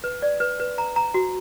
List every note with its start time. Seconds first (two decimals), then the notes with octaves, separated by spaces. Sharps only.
0.04 B4
0.22 D5
0.40 B4
0.60 B4
0.78 A#5
0.96 A#5
1.14 F#4